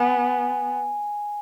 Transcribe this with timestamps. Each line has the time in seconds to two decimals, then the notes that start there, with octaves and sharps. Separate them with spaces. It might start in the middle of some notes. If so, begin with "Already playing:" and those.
Already playing: B3 G#5